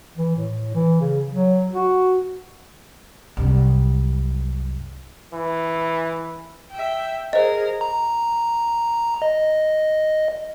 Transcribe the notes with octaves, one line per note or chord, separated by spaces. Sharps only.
E3
A2
E3
C#3
F#3
F#4
C2 F#2
E3
E5 G5
G#4 A#4 C5 D#5
A#5
D#5